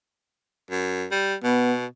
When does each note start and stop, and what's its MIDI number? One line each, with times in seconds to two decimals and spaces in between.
0.71 1.06 42
1.11 1.35 55
1.44 1.86 47
1.44 1.75 59